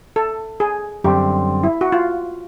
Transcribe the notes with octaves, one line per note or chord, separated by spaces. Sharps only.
A4
G#4
F#2 D3 G3 C4 G4
E4
F#4
F4